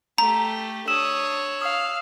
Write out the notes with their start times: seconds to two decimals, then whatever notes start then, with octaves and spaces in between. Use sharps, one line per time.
0.18 A3 G4 A#5
0.88 D4 C#5 D#6 E6 E7
1.62 F5 D#6